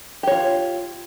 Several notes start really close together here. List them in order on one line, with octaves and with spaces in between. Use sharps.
G4 C#5 F4